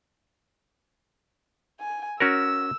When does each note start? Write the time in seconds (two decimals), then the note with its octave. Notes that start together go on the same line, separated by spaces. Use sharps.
1.80 G#5
2.20 C#4 F#4 A#4 E6